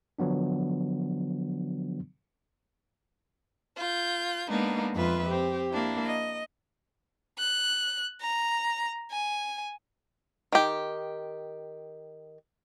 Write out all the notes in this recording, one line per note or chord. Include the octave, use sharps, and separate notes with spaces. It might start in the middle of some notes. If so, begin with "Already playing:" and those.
D3 F3 F#3 B3 D4
F4 G6
G#3 A#3 B3 D4 D#4
F2 F4 B4 E5
C4 G4
A#3 D4 E4
D#5
F#6
A#5
G#5
D#3 G4